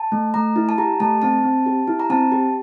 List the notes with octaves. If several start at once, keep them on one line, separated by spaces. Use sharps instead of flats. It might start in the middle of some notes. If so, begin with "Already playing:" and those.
Already playing: A5
A3
A3 A#5
E4
A5
G4 A#5
A3 A5
C4 A5
C4
G4
E4
A#5
C4 A5
G4